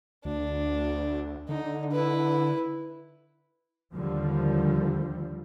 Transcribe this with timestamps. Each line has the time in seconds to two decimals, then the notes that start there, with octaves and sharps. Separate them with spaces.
0.25 D2 D4
1.49 D3 D#4
1.92 E4 B4
3.94 D#2 D3 F3 G3